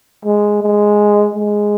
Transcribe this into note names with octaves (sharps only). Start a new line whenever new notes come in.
G#3
G#3
G#3